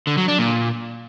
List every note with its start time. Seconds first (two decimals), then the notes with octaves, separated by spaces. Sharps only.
0.07 D3
0.18 F#3
0.28 D4
0.39 A#2